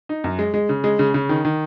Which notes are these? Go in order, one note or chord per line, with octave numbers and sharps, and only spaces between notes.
D#4
F#2
G#3
G#3
C#3
G#3
C#3
C#3
D#3
D#3